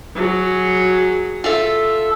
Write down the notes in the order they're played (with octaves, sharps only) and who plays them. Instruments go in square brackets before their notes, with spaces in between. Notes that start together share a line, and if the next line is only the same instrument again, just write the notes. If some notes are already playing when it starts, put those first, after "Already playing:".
[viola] F#3 G#4
[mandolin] F4 A4 E5